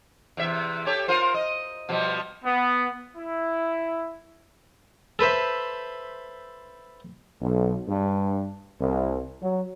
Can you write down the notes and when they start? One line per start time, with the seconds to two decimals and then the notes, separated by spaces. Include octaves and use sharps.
0.37 E2 C3 E5
0.86 G4 A4 C#5
1.08 F4 A#4 C5
1.34 D#5
1.89 B2 F3 G3
2.44 B3
3.16 E4
5.19 A4 B4 C5 E5
7.41 B1
7.87 G2
8.79 C2
9.41 F#3